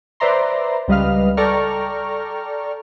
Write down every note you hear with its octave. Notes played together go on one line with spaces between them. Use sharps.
B4 C5 D5 E5 A#5 C6
C#2 G3 B4 D#5 F5 F6
A4 D5 G5 A#5 C#6 F6